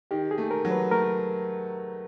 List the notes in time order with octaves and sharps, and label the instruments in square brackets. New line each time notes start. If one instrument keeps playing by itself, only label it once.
[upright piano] D#3 [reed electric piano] G4
[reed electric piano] G#4
[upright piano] A3
[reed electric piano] A#4
[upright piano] F#3
[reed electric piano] B4
[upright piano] A3 [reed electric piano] A#4